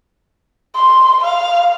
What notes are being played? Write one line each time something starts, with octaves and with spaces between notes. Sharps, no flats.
C6
F5